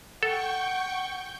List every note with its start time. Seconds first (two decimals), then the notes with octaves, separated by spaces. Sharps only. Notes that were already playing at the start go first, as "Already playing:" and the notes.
0.23 A4 F#5 G5 C#6 G6